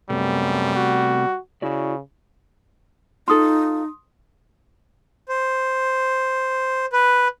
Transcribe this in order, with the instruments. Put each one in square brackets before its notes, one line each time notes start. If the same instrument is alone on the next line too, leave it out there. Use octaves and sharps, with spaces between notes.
[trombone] F#2 [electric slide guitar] C3 A3 B3 [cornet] G3
[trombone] F#4
[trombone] C#3 [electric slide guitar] E4 F#4 D5
[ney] D#4 [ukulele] F4 A4 [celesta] C6 D#6
[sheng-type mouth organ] C5
B4